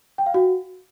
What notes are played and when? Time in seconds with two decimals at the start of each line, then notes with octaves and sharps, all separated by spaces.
0.18 G5
0.26 F5
0.34 F#4